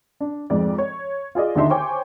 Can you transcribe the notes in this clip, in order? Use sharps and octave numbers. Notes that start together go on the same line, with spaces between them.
D4
F2 G#2 D5
C#5
F4 G#4 D5 D#5
D#2 D3 D4 D#4 E5 C6
C5 C#5 G5 G#5 C#6 D6